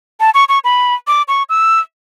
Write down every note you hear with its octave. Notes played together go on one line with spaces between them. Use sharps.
A5
C#6
C#6
B5
D6
C#6
E6